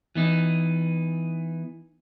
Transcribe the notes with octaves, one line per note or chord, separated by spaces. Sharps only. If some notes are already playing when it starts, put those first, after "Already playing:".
E3 B3 D#4